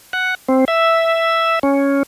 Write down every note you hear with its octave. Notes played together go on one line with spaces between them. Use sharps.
F#5
C4
E5
C#4